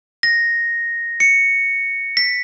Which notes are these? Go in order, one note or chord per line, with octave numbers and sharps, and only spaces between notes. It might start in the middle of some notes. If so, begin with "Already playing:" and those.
A#6
C#7
B6